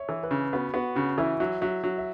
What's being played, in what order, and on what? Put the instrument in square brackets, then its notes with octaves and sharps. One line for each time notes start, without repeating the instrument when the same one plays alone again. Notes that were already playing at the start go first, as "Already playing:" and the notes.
Already playing: [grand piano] C#5 E5
[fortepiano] E3
[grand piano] B4
[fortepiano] C#3
[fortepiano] B3 [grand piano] F#4
[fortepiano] B3 [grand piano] F#4
[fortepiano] C#3 [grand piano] F#4
[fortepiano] E3 [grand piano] E4
[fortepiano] F#3 [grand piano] E5
[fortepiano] F#3 [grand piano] E5
[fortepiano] F#3
[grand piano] E5